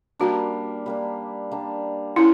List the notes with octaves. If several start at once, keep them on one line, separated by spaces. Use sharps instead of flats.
G3 A#3 D4 F#4
G3 A#3 D4
G3 A#3 D4
A#3 C#4 E4